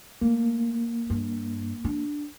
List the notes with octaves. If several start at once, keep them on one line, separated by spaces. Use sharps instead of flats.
A3 A#3
G2
D4